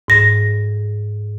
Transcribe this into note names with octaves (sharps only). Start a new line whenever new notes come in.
G#2 A#6